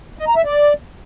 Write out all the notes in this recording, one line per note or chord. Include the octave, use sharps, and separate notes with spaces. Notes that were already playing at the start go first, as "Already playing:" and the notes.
D#5
A#5
E5
D5